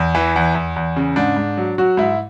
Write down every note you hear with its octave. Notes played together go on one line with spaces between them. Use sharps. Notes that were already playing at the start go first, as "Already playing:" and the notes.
Already playing: E2
E3
E2
E2
E2
C#3
G#2 D4
G#2
F#3
F#3 F#4
G#2 E4